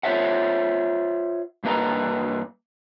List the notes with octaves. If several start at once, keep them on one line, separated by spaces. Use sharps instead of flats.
F4 C5 C#5 E5 F#5
G2 A#3 B4 D#5 A#5